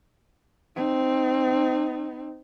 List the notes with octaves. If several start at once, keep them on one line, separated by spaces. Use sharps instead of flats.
C4 D#4